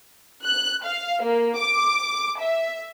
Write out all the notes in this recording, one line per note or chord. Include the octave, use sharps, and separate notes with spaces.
F#6
F5
A#3
D6
E5